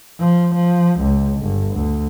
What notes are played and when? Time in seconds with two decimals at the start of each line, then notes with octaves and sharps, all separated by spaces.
0.20 F3
0.54 F3
1.00 C#2
1.41 G1
1.75 D2